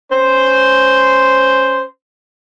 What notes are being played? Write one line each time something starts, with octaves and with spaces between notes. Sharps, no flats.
C#4 C5